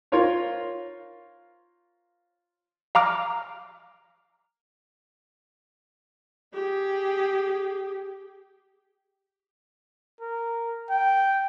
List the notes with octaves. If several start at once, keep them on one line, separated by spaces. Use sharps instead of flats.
F4 A#4 C5 C#5 F5
F5 A#5 D6 F6
G4 G#4
A#4
G5